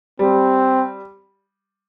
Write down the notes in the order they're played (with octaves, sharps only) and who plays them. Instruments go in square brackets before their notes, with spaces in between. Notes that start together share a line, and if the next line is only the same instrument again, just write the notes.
[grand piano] G3 [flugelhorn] C4